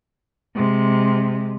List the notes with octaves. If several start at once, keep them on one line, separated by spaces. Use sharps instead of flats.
C3 G#3